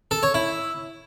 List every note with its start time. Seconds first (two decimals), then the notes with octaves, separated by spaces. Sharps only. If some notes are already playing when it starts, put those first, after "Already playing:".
0.11 A4
0.23 C#5
0.34 E4